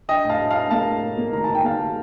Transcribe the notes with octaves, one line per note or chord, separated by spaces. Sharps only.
D4 D#5 G5
A2
F5 A5
A2
D4 F5 A5
A#3 F5 A5
A2
A2
A#3
D#3 A#5
D#3 A5
G5
A#3 F5 A5
D#3